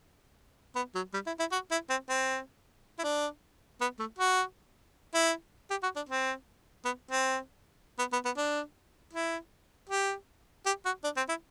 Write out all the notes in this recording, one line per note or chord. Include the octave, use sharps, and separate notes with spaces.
B3
F#3
G3
E4
E4
F#4
E4
C4
C4
E4
D4
B3
A3
F#4
E4
G4
F#4
D4
C4
B3
C4
B3
B3
B3
D4
E4
G4
G4
F#4
D4
C4
E4